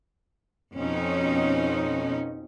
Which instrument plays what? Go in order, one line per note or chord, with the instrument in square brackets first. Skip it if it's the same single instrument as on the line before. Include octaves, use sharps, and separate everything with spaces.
[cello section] F2 B2 C#4 D#4